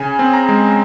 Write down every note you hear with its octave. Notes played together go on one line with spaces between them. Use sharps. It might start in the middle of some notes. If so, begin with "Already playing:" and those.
Already playing: C#3 G#5
C4
A#5
G#3